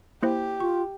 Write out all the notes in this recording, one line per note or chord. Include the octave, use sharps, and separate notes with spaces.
A#3 E4 G4 C5
F4 C#6